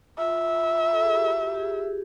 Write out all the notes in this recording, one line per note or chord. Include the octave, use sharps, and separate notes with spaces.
F4 E5
A4
G#4
G4
F#4
G4
G4
G#4